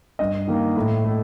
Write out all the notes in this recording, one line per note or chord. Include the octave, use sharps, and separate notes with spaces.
G2 D#5
D#3 A#3
A2
A3